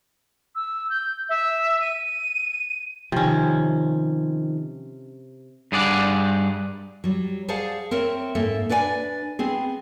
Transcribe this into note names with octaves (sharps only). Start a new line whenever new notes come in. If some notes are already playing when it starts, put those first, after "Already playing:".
E6
G6
E5
D#7
C3 D#3 F3 C#4
G2 G#4 D5 F#5
F#3 G3
G#4 C5 D5 F5 F#5 A5
C4 A#4 C#5 E5
G#2 A#3 A4 E5
D4 B4 D5 F#5 G#5
B3 C4 G#4